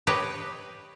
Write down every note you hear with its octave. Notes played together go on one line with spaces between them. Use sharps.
G4 B4 C#5 D#5